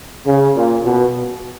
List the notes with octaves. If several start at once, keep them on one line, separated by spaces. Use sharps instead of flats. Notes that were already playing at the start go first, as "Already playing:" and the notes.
C#3
A#2
B2